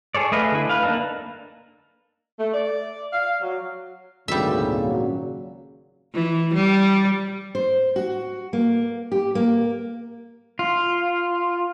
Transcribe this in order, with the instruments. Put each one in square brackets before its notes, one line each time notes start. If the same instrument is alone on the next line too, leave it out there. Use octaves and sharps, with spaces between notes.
[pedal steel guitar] G#4 A4 C#5 D5
A3 G#4 B4 D#5 F5
D3 E4
B4 F5
A#3 D4 D#4 A4
[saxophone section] A3
D5
F5
F#3
[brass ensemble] G#1 A#2 [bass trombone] D2 [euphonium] C#3 [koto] G3 E5
[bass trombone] F#3
[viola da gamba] E3
G3
[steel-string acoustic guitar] C5
F#4
A#3
G4
A#3
[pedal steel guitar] F4